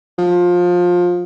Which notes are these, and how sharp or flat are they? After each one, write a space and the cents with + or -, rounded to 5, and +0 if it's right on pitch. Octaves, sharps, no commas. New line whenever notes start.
F3 +20